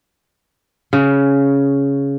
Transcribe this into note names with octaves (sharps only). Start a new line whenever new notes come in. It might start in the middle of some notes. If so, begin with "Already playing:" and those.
C#3